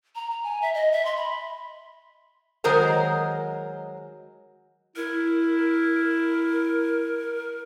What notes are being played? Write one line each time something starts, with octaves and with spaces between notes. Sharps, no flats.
A#5
A#5
G#5
E5
D#5
E5
C6
B5
D#3 F#3 G#3 A#4 C5 A#5
E4 A#4